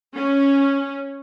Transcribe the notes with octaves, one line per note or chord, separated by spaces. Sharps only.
C#4